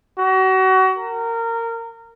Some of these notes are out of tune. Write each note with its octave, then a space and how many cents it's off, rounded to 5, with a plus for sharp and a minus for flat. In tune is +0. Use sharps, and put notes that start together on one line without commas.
F#4 +30
A#4 -20